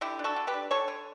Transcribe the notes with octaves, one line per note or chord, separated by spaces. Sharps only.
D3 E4 G4
D4
F#4 A4
D3
G4 B4
D4
D3 A4 C#5
D3